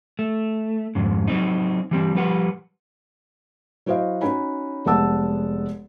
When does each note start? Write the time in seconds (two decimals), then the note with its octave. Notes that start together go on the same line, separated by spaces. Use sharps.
0.19 A3
0.95 F2 G#2 C#3
1.28 F#3 C4 D#4
1.91 E3 G3 C4
2.15 F3 G3 B4 F#5
3.86 F#3 E4 F#4 C5 D#5 F5
4.21 C#4 D#4 F#4 G#5 B5
4.86 F1 G#3 B3 F#5 A5 E6